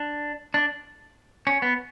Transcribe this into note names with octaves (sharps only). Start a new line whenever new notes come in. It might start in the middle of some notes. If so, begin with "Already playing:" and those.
Already playing: D4
D4
C#4
B3